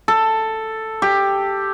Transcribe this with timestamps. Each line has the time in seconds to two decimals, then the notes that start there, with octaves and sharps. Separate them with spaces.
0.08 A4
1.02 G4